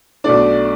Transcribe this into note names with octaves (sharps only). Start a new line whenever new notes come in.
B1 B2 A3 D4 D5